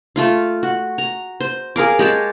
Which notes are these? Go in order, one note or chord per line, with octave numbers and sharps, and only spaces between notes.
A3 F4 F5
F#4
A#5
C5
G#4 A#4 F5 D6
G#3 G4 C#5 A5